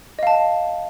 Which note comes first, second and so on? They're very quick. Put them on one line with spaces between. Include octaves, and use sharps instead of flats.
D#5 F5 A5